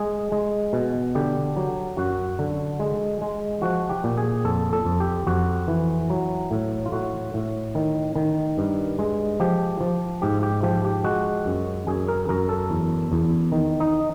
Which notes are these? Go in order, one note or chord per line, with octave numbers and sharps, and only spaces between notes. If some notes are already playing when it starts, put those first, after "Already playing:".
Already playing: G#3 G#4
G#3
B2
D3 G4
F#3
F#2 F#4
D3
G#3
G#3
F3 F#4
G4
A#2
G#4
F2 A4
A4
F2
G4
F2 F#4
E3
F#3
A2
F4
A2 F#4
A2
D#3
D#3
G2
G#3
F3 G4
F3
G#2 G4
G4
F3 G4
G4
G#3 F#4
F#2
F#2 G#4
A#4
F#2 A#4
A4
E2
E2
D#3
D#4